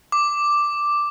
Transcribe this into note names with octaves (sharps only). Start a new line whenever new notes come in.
D6